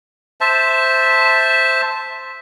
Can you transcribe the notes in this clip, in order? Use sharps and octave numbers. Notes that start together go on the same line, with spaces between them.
C5 E5 A5